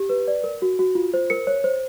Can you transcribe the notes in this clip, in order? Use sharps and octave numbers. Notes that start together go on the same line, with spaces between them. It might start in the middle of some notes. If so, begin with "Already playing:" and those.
Already playing: G4
B4
D5
A#4
F#4
F#4
F4
C5
A#4 C#7
C#5
C5